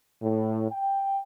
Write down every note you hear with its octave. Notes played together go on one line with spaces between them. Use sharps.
A2
G5